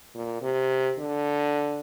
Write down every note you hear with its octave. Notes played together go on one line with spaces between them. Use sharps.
A#2
C3
D3